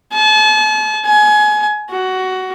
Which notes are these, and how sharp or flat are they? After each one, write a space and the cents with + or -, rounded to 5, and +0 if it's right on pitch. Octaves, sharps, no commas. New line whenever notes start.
A5 -40
G#5 +25
F#4 +15